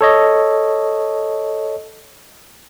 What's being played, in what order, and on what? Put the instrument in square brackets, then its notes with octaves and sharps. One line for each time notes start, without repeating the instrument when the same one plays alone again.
[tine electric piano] A4 C#5 D#5